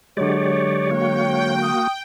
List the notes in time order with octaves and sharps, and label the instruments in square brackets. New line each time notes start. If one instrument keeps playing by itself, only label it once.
[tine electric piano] D3 F#3 G#3 [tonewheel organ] G4 D5 [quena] C#5
[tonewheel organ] A#3 F#4 [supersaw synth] G5
[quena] D#6